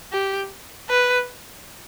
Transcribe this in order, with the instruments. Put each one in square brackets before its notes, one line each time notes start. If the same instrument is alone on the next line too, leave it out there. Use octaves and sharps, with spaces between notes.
[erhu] G4
B4